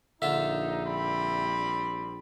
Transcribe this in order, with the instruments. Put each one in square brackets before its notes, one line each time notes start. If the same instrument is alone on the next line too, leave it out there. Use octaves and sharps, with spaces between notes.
[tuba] A#1 [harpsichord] D3 F4 [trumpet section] D#4 [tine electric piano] E5
[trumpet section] G3 C4 B5